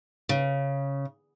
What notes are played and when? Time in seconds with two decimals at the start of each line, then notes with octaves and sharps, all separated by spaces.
0.29 C#3